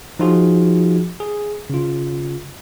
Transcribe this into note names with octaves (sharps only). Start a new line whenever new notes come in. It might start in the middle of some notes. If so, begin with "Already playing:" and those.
F3 D#4 F4 F#4 G#4
G#4
C#3 F4